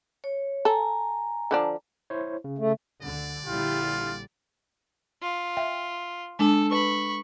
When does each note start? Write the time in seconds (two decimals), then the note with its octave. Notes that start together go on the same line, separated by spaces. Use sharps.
0.24 C#5
0.65 A4 G#5 A#5
1.51 D3 F3 D4
2.10 E4 C5 C#5
2.44 C#3
2.58 A3
3.02 D2 D3 D5
3.45 A#1 D3 G3 E4 F4 G4
5.22 F4
5.57 E5 G5
6.39 G#3 D4 A4
6.71 B4 B5 C#6